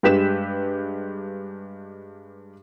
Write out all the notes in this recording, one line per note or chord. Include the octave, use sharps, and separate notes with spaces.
G2 G#3 G4 B4 B6 E7